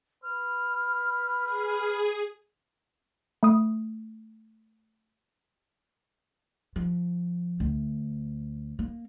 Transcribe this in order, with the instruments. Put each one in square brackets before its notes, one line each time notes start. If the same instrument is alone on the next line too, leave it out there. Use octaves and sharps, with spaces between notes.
[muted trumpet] B4 [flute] F6
[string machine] G#4
[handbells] A3 D#6
[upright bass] F3
D2
A#3